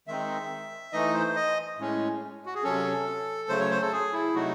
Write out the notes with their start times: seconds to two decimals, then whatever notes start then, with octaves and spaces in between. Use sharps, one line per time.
0.07 D#3 G#3 C4 D#4 E5
0.93 E3 A3 D#4 D#5
1.14 C5
1.36 D#5
1.78 A2 G#3 C#4
2.46 F#4
2.55 G#4
2.63 C3 F#3 C#4 A4
3.49 C#3 F#3 A3 C5
3.59 C#5
3.70 C5
3.81 A4
3.92 G#4
4.13 E4
4.34 C3 F#3 A3 D#4 F#4